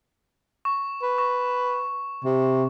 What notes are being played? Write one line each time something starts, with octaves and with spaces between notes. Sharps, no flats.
C#6
B4
C#6
C3